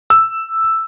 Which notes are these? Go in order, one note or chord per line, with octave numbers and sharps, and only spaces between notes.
E6